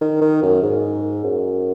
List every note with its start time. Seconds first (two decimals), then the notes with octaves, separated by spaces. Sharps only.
0.01 D#3
0.21 D#3
0.42 F#2
0.63 G#2
1.23 F#2